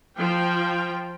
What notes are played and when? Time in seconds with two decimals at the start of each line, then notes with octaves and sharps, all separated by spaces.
0.17 F3 G5